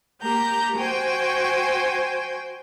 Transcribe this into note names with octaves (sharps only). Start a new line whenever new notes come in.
A#3 G4 A#5 G6
F#4 C5 G5 G#5